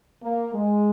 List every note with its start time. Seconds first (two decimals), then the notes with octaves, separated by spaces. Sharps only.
0.22 A#3
0.54 G#3